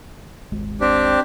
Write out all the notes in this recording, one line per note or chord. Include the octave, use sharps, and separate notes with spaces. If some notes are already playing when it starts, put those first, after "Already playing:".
D#1 G#1 G#3
C4 D4 G4